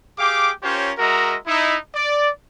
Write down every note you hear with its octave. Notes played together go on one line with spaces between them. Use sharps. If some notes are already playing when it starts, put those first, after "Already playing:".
G4 G#4 F5 G5 D6
C#4 F4 G4 A#4 C5 C#5
G#3 F#4 A#4 D#5 E5 A#5
D#4 E4
D5